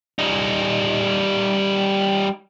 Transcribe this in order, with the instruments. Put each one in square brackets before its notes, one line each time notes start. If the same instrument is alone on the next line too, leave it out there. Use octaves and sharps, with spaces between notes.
[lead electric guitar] G3 D#4